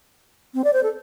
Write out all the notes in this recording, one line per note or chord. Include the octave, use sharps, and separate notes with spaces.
C4
D5
C5
A4